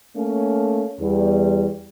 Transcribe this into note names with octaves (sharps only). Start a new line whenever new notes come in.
A3 A#3 C#4
E2 G3